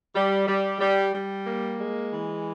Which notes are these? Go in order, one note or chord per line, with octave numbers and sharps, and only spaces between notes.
G3
G3
G3
G3
A#3
G#3
E3